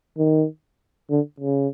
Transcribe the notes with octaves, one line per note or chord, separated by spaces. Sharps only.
D#3
D3
C#3